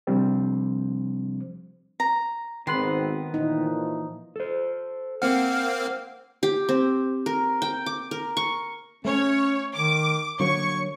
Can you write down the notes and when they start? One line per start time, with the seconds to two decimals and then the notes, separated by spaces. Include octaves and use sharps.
0.07 C3 F3 G3 C4 D4 C5
2.00 A#5
2.67 G#1 D#3 B3 C4 B5 C6
3.34 A#2 E3 F3 D#4
4.36 A4 C5
5.22 A#3 C4 F5 F#5
6.43 G4
6.69 C4
7.26 A#4
7.62 G5
7.86 D6
8.11 A#4
8.37 C#6
9.05 A3 C#4 C#5
9.75 D#3 D6
10.40 D3 F#3 A#3 C#5 C#6 C#7